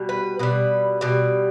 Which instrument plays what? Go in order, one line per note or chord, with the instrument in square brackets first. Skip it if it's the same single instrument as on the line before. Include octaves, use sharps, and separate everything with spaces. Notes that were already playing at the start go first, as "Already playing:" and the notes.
Already playing: [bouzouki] B2 G3
B4
B2 G3 B4
B2 G3